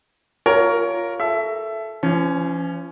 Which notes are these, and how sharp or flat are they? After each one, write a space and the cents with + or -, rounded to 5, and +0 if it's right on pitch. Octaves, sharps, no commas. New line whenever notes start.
F4 +0 A#4 +0 C#5 +20
A4 -20 E5 +15
F3 -40 C#4 +0